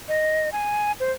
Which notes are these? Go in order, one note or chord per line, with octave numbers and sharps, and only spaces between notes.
D#5
G#5
C5